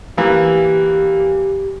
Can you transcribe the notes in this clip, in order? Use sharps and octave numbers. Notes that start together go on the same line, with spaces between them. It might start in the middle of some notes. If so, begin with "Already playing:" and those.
E3 A#3 G4